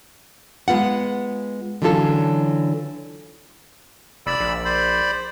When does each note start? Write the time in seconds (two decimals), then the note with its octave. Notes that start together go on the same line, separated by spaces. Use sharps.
0.68 G#3 B3 F4 F#5
1.82 D3 E3 F#3 C#4 F4 A4
4.27 F1 D5 B5 E6
4.40 A#1
4.65 C5 D5 B5